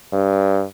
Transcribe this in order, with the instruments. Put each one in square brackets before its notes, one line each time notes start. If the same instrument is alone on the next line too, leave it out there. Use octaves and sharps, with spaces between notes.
[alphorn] G2